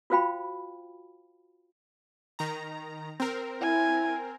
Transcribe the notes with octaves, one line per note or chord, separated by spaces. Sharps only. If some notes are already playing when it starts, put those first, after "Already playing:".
F4 F#4 C5 F5 G5 B5
D#3 A#5
C4 A#4
E4 G#5